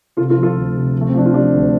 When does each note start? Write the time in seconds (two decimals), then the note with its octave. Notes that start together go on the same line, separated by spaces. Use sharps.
0.17 C3 F4 A4
0.29 F4 A4
0.36 F3
0.43 F4 A4
0.56 D2
0.75 C3
0.95 F3
1.01 A3
1.09 C4
1.14 F3 D4
1.25 F4
1.34 F3 D4 G4
1.54 D2